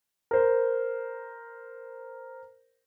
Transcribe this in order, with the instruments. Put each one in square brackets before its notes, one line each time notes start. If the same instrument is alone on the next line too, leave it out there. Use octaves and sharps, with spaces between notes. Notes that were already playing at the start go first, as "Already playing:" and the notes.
[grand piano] A#4 C5